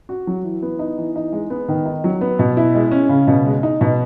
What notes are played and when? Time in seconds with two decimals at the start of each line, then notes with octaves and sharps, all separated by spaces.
0.09 F#4
0.27 F#3
0.44 E3
0.62 B3
0.79 D#4
0.98 E3
1.16 D#4
1.32 G#3
1.50 B3
1.68 D#3
1.86 D#4
2.04 F#3
2.21 B3
2.39 B2
2.57 E4
2.75 G#3
2.91 C#4
3.09 C#3
3.27 B2
3.46 G#3
3.63 D#4
3.81 B2